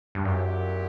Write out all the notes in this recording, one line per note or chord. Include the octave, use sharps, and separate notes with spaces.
G2
F#2 A#2 F#3 B3 E4 G4